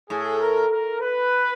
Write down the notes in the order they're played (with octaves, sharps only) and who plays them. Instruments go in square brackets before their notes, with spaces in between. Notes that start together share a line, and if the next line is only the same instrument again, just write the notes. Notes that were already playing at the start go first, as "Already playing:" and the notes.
[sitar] A2 [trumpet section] G#4
[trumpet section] A#4
A#4
B4